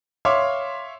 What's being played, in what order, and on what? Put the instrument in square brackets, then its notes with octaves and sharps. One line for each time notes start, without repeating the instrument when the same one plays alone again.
[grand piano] C#5 E5 F5 C6 D6